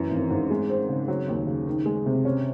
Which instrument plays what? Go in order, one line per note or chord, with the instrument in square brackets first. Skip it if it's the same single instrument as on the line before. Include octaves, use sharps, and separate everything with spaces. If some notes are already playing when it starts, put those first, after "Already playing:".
Already playing: [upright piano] F#2 E3
G#1
G#2
G#3
C4
C#3
F#3
D#2
C#3
D#3
G#3
C3
C#4